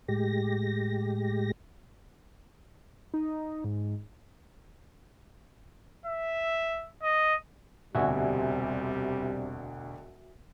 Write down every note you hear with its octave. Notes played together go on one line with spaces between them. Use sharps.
A2 G#3 G4 A#6
D#4
G#2
E5
D#5
E1 D2 C3 G3 F#4 E5 G#5